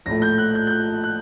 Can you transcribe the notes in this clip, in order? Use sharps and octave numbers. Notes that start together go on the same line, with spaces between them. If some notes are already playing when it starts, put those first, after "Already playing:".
A#1 A2 A3 A#6
G6
F#6
G6
G6
F#6
F#6